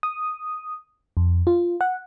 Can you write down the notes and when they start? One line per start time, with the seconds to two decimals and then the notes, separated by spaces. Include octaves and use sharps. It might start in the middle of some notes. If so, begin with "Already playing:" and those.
0.03 D#6
1.17 F2
1.47 F4
1.81 F#5